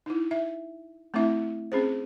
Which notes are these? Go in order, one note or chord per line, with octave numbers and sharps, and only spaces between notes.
D#4 E4
E5
A3 C4 D4 E4 E5
C4 C#4 G#4 C5